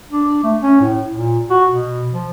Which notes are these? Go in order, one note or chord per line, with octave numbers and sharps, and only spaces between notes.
D4
A3
C#4
A2
A#2
F#4
B2
F3